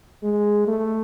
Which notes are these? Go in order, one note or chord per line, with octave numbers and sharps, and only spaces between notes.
G#3
A3